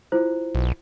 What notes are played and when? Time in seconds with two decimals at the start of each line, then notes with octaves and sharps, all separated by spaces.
0.12 E4 F4 C5
0.55 B1